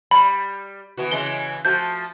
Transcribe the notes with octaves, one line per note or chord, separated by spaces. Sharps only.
G3 B5
E3 B3 F#4
C#3 E3 G#3 G7
F3 A3 F#4 G6